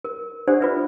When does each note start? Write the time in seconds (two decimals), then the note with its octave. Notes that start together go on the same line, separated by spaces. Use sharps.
0.05 A#4
0.47 D4 G4 A4 C5 D5 F#5
0.61 F4 B4 E5